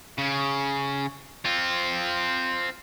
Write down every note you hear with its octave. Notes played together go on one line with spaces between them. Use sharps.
C#3
C4 F4